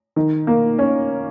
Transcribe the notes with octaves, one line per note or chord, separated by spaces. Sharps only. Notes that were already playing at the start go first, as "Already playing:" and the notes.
D#3
A#3
C#4